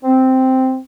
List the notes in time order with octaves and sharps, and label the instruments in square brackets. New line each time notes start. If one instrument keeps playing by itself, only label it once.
[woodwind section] C4